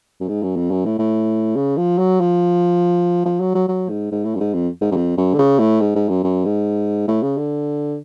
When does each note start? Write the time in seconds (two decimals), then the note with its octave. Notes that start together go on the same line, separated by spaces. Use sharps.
0.20 F#2
0.28 G#2
0.43 F#2
0.56 F2
0.71 F#2
0.85 A2
0.99 A2
1.56 C#3
1.77 F3
1.98 F#3
2.20 F3
3.26 F3
3.40 F#3
3.55 F#3
3.68 F#3
3.90 G#2
4.12 G#2
4.25 A2
4.35 F#2
4.40 G#2
4.54 F2
4.81 G#2
4.91 F#2
4.96 F2
5.17 F#2
5.34 D3
5.39 C#3
5.59 A2
5.81 G#2
5.95 G#2
6.09 F#2
6.24 F#2
6.46 G#2
7.08 A2
7.23 C#3
7.38 D3